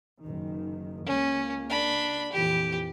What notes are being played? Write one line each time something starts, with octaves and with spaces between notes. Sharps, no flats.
F#1 D#3
C#2 A#3 C#4
D4 B5
F2 A#2 E3 G4